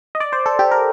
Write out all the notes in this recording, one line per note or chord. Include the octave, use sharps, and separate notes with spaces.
D#5
D5
C5
A4
G4
A#4